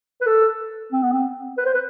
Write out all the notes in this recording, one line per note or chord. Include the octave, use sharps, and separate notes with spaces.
B4
A4
C4
B3
C4
B4
C5
B4